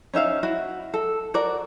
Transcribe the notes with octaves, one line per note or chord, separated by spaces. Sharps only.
C#4 D#4 E5 F5
E4 F#4
A4
F#4 A#4 D5